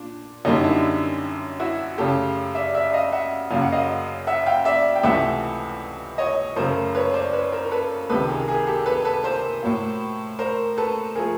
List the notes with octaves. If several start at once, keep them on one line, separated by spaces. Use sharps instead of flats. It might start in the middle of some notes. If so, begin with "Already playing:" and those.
Already playing: A#2 D4
F#2 D3 G3 A#3 C#4 D#4
D4 E4
E4 F#4
F#2 C#3 F#3 A3 G4 A4
D5 E5
D5 E5
D#5 F5
E5 F#5
F#2 C#3 F#3 A#3 F5
F#5
D#5 F5
E5 F#5
F5 G5
D5 E5
G5
C#2 C3 E3 A3 E5 F#5
C#5 D#5
F#2 C#3 F#3 A3 A#4 C5
B4 C#5
C5 D5
B4 C#5
A#4 C5
A#4
A4 B4
C#2 C3 D#3 A4 B4
G#4 A#4
G#4 A#4
G4 A4
A4 B4
A4 B4
A#4 C5
A2 F#3 A#3
A#4 C5
A4 B4
F3 A3 G#4 A#4